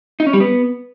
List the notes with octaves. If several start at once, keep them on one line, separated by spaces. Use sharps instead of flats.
D#4
C#4
G3
B3